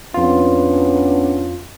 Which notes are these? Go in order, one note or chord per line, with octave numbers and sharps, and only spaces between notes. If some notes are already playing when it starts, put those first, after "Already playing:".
F2 B3 C#4 D4 F4